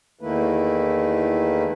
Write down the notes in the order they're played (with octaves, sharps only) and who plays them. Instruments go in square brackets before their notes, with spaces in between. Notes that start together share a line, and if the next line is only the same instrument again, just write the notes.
[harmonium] E2 D#3 A3 A#3 E4 B4